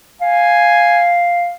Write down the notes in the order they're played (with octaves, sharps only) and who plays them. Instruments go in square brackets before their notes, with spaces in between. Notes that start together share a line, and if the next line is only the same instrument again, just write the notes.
[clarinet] F5 [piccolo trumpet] G#5